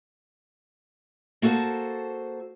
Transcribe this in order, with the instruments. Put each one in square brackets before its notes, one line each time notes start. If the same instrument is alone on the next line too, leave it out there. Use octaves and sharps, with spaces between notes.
[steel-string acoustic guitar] A#3 F#4 A4 C5 A5